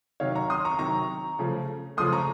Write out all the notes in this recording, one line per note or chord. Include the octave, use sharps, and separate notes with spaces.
C3 D#3 F#3 C#5 F5
A#5 C#6
C6 D#6
A#5 C#6
C3 D#3 F#3 A#5 C#6
C#3 F3 A3
C#3 F3 A3 C6 D#6
A#5 C#6